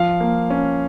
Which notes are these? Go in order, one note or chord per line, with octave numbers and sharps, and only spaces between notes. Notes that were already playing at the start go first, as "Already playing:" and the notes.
Already playing: F3 F5
A#3
C#4